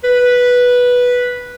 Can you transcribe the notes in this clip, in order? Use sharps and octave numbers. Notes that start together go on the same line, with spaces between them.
B4